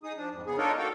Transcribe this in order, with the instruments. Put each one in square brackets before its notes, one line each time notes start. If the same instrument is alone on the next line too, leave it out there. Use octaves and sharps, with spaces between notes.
[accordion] D#4 G#4 D#6
F3 D4
F2 G#2
C#3 B3 G#4
D4 D#4 F4 A4 A#4 C#5
A#3 F#4 A4 F5 G5